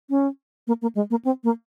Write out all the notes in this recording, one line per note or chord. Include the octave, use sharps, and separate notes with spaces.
C#4
A#3
A#3
G#3
A#3
C4
A#3